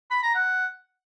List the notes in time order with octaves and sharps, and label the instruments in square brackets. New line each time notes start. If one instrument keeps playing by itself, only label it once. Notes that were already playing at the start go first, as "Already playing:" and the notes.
[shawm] B5
A#5
F#5